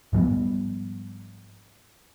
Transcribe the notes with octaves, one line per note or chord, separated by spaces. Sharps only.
G#2 F3 G3 B3